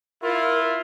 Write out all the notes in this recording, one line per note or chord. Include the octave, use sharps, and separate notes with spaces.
E4 F4 A#4